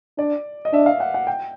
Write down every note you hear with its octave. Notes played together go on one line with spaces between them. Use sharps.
D4 D5
D#5
D4 E5
F5
F#5
F#5
G5